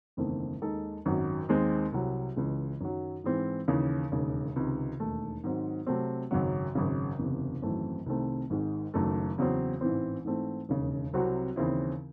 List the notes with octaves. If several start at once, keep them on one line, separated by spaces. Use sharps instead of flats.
F#1 E2 D#3 A3 C4
D#2 D#3 G#3 D#4 A4
G#1 F#2 D#3 F#3
D#2 D#3 G#3 C4
C2 C3 F#3
C#2 C#3 E3 G#3
F#2 D#3 F#3
G#2 E3 G#3 C4
D#2 C#3 E3
E1 D#2 C#3
C#2 C3 D#3
E1 D#2 D#3 A3
G#2 D#3 F#3 C4 D#4
C3 F#3 A3 C4
G#1 F#2 C#3 F#3
G#1 F#2 C#3
F#1 E2 C3
G#1 F#2 E3 A3 C4
C2 C3 D#3 A3 C4
G#1 G#2 D#3 G#3
F#1 F#2 D#3 A3
E2 C#3 F#3 C4
A1 G#2 E3 C4
G#2 E3 A3 C4
E1 D#2 C#3
C2 C3 F#3 C4 F#4
D#2 C#3 E3 C4 E4